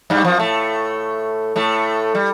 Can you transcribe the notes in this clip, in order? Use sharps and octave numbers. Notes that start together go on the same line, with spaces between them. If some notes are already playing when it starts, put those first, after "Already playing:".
G2 G3
F2 F3
A2 A3
A2 A3
G3